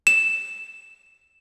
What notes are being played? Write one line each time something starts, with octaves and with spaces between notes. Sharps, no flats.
E7